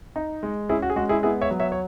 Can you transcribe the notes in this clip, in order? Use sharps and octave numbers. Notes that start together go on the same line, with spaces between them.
D#4
G#3
C#4 E4 G#4
F#4
G#4
G#3 F#4
E4 G#4
B3 E4 G#4
C#5 E5
F#3
C#5 E5
C#5